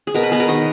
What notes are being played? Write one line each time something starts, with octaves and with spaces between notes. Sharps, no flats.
G#4
B2 A#4
B4
B3 G#4
A#4
D#3 D#5